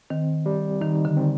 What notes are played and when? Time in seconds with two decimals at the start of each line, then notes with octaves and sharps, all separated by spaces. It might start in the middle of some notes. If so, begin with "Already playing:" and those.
0.10 D#3 C4
0.46 G3
0.81 D#3 D#4
1.05 D3
1.17 C4